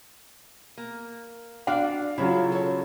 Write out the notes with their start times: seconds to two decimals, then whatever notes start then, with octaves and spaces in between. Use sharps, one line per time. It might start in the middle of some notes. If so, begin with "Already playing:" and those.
0.78 A#3
1.67 D4 F#4 D5 F5
2.18 C#3 F#3 E4 F4
2.52 A4 C#5